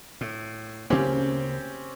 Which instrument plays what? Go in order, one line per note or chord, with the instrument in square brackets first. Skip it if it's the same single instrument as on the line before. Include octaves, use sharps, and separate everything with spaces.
[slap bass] A2
[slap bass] D2 C#3 A#3 [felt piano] C4 C#4 G4